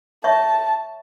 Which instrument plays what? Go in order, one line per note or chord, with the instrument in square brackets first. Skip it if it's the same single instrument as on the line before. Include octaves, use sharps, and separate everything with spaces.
[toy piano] C#5 E5 C#6 [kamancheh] A5